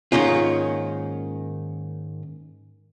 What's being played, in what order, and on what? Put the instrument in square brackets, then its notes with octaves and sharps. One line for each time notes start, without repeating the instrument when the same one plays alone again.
[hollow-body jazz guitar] G#2 D#3 A#3 C#4 F4